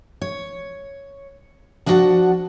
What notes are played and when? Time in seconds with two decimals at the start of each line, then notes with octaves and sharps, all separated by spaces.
0.22 C#5
1.86 F3 D4 E4 F#4 F#5 A5